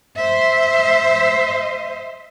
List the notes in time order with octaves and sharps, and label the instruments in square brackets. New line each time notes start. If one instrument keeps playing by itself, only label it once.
[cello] C5 E5